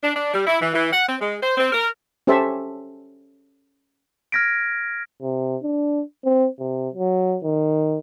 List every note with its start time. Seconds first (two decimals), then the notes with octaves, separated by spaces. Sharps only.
0.03 D4
0.15 D4
0.34 G3
0.47 E4
0.61 E3
0.74 E3
0.93 F#5
1.08 C4
1.21 G#3
1.42 C5
1.58 C4
1.73 A#4
2.27 C#4 G4 A4 C5 E5 A5
4.32 F6 G#6 A#6 B6 D7
5.22 C3
5.63 D4
6.25 C4
6.59 C3
6.94 F#3
7.43 D#3